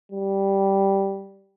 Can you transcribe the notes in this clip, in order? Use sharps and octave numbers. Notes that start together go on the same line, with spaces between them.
G3